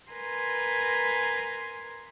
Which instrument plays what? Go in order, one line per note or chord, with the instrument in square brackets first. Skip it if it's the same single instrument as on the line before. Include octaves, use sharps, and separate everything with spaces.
[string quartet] A#4 B4 G#5 A#5 C6